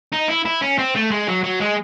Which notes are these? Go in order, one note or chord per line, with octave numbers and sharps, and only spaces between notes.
D#4
E4
E4
C#4
C4
A3
G#3
F#3
F#3
G#3